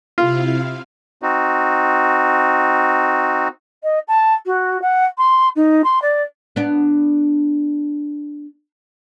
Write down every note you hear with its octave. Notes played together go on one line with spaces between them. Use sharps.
C3 E4 F4 F5
C4 D#4 F#4
D#5
A5
F#4
F#5
C6
D#4
C6
D5
B3 D4